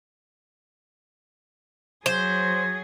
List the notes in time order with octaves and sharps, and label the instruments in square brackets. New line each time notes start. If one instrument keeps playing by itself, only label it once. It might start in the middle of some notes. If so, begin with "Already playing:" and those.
[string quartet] F#3 G#4 [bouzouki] C5 [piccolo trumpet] G#6